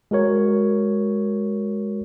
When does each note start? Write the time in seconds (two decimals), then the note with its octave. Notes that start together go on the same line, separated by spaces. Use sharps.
0.11 G#3 F#4 A#4 C#5